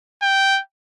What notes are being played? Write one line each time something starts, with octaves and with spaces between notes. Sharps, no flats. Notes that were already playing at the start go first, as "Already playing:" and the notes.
G5